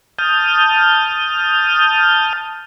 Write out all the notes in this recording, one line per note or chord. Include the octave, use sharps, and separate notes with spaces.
A5 D#6 F6 G6